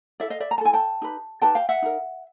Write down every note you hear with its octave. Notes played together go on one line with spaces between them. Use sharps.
E4 A4 D5 E5
D#5 F5
D5 E5
A#5
A5
E4 A4 G#5
G5 A5
D#4 G4 B4
D#4 G4 B4 G5 A5
F5 G5
E5 F#5
D#4 F#4 A#4